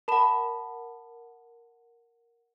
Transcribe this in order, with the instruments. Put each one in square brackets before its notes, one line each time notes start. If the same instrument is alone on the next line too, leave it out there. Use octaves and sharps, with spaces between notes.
[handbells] A#4 F#5 [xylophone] A5 B5 E7